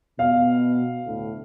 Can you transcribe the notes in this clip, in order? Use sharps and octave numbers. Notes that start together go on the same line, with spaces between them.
B2 F5
D2 A2